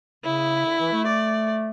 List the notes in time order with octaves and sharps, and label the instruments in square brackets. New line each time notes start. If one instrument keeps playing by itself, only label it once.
[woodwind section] C#3 [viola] E4
[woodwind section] D3
E3
A3
[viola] D5